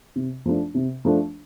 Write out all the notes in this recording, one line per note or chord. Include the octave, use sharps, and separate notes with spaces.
C3
F3 A3 D4
C3
F3 A3 D4